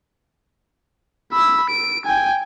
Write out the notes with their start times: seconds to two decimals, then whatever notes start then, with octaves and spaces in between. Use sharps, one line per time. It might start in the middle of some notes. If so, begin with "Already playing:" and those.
1.32 B5 E6
1.70 D7
2.06 G5 G#5